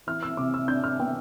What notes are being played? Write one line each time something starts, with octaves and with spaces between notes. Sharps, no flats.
E3 F6
E6
C3 D6
E6
D4 G6
F6
B3 G5